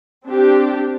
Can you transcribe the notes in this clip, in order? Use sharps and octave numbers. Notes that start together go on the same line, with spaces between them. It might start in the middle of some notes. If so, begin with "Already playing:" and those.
C4 D4 G4